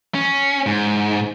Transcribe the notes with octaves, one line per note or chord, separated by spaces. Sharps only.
C#4
G#2